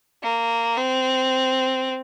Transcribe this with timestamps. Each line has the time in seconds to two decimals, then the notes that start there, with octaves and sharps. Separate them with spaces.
0.23 A#3
0.78 C4